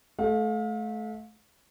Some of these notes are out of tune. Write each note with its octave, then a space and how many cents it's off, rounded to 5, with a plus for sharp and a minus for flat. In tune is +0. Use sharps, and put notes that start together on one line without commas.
A3 -25 F5 +35